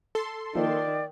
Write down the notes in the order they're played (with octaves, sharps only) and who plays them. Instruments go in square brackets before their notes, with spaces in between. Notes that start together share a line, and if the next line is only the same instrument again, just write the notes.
[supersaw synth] A4 C6
[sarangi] D#3 [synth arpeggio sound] F3 A#3 [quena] D5